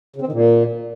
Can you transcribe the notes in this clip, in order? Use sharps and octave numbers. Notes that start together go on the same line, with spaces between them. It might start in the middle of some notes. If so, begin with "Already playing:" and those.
C#3
C4
D#3
A#2